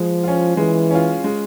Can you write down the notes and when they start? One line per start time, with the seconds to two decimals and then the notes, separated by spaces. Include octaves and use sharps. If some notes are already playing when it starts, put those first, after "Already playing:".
Already playing: F3 G#3
0.24 C#4 F4
0.57 E3 G#3
0.90 C#4 F4
1.24 G#3